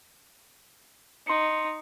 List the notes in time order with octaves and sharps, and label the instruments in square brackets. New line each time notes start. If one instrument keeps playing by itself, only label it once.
[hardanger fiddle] D#4 [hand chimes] C6 C#7